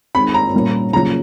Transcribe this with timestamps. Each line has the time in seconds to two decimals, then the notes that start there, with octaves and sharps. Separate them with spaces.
0.15 D#3 G#3 C4 B5
0.34 A#5
0.54 A#2 G3 A#3 C#4
0.93 C#3 F#3 A#3 C#4 F4 A#5